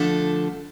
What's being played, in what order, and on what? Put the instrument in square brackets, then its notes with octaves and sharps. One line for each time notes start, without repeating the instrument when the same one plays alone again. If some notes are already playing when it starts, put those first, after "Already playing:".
Already playing: [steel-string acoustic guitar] D3 F3 A3 D4 A4